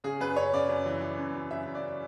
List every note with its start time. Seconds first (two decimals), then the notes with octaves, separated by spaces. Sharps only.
0.04 C#3 G#4
0.20 F#2 B4
0.36 F#2 C#5
0.53 C#3 D5
0.69 F#2
0.86 E3
1.02 E3
1.18 F#2
1.35 F#2
1.51 F#2 E5
1.67 F#2
1.75 D5